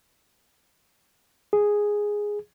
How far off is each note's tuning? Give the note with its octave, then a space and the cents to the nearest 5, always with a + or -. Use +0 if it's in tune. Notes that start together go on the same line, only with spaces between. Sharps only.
G#4 -5